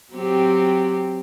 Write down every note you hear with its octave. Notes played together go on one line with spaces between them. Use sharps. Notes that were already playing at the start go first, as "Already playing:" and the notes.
F#3 C4 G4